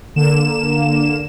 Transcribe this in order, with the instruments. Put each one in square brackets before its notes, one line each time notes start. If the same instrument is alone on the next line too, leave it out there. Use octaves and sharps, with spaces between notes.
[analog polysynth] D3 A#3 E7